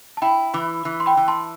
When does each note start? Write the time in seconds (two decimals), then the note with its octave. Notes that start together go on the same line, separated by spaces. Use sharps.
0.17 A5
0.22 E4 G5 B5
0.54 E3 B5 D6
0.85 E3
1.00 C6
1.06 G5 B5
1.17 E3
1.28 A5 C6